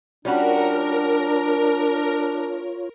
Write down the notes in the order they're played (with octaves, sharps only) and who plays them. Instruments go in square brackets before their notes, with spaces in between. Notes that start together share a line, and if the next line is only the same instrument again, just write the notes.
[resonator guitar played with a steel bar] G3 C#4 F#4 [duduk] D4 [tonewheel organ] F4 C#5 [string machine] A#4